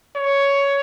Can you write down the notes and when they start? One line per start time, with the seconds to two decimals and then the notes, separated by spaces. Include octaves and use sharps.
0.16 C#5